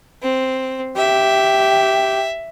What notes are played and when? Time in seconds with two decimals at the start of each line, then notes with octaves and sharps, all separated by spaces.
0.22 C4
0.97 G4 E5